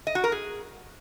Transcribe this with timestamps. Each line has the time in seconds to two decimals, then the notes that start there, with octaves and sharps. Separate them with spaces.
0.07 D#5
0.15 F#4
0.24 A#4
0.32 G#4